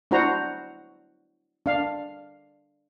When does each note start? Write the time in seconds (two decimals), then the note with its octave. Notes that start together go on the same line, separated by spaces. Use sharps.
0.11 D4 E4 F#4 C5 A#5
1.66 D4 F5